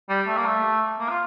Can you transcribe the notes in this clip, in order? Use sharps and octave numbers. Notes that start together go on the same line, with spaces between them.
G3
A3
A#3
A3
A#3
F4